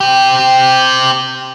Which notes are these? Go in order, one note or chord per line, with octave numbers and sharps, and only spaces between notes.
C4 G4